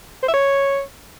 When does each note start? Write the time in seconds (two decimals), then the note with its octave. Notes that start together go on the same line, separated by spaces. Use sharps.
0.23 C5
0.28 E5
0.34 C#5